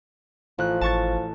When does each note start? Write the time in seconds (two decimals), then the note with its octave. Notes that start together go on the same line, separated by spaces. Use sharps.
0.58 A1 F3 F4 F#6
0.81 G#1 A5 C#6 A6